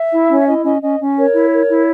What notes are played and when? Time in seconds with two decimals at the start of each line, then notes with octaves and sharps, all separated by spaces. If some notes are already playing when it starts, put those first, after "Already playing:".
Already playing: E5
0.12 E4
0.29 C#4 C#5
0.46 E4 D#5
0.64 C#4 D#5
0.81 C#4 D#5
1.00 C#4
1.17 A#4 C#5
1.34 E4
1.53 A#4
1.70 E4